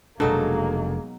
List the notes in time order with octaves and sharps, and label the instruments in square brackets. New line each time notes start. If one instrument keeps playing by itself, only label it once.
[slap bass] F1 D4 [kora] B2 F#3 D#4 [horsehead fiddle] G#3 A#3 [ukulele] A4